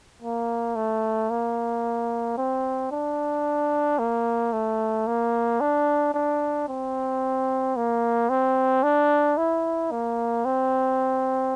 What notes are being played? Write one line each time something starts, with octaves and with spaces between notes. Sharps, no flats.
A#3
A3
A#3
C4
D4
A#3
A3
A#3
D4
D4
C4
A#3
C4
D4
E4
A#3
C4